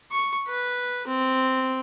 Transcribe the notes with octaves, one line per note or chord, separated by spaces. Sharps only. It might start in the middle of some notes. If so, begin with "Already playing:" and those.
C#6
B4
C4